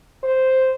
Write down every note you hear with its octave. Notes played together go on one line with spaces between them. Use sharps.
C5